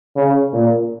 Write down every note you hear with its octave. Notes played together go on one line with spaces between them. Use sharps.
C#3
A#2